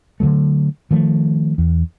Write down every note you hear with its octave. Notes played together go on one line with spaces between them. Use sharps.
D3 D#3 F#3 A3
D#3 F3 A3
E2